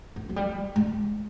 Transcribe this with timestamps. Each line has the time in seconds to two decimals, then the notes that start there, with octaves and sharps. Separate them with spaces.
0.16 E3
0.29 F#3
0.36 G3
0.76 G#3